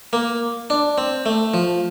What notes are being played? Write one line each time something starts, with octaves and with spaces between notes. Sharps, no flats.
A#3
D4
C4
A3
F3